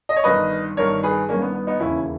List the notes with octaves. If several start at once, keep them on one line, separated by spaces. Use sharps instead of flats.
D#5
C#5
G1 G2 D#3 B4 D#5
G1 G2 D#3 A#4 C#5
G#4 B4
G1 G2 D#3 A#3 C#4
B3
B3
B3 D#4
E1 D#2 C#3 E3 C#4 E4